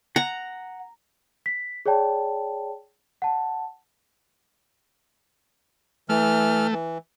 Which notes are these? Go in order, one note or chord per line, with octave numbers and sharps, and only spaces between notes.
F#5 A#5
B6
G#4 C#5 D5 G5 A5
F#5 A5
E3 A3 F6
E3